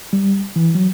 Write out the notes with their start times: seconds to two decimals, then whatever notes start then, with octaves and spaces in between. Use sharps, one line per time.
0.13 G3
0.56 E3
0.75 F#3